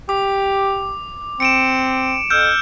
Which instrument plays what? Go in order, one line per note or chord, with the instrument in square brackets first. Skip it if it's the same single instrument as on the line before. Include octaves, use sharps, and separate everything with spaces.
[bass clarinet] G4 [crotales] D6
[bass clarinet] C4 [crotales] C#7 D7 E7
[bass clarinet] F2 [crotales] E6 F6 G6